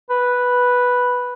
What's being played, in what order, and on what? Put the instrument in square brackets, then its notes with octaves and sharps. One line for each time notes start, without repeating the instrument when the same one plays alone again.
[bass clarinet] B4